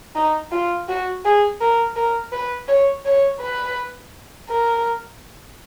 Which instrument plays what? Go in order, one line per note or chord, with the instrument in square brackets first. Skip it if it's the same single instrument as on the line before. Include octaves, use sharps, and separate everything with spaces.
[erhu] D#4
F4
F#4
G#4
A#4
A#4
B4
C#5
C#5
B4
A#4